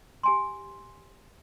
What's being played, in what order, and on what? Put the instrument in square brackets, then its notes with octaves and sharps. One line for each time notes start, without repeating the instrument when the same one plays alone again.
[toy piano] G4 G#5 C6